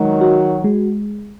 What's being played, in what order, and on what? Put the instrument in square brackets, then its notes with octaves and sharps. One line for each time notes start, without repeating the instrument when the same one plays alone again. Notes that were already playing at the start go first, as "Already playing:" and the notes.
Already playing: [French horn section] D#3 F#3 [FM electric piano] G#3
[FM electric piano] F#4
G#3